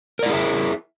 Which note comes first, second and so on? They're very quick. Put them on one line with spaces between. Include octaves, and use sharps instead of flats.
A#4 D5 E4 G#4 E5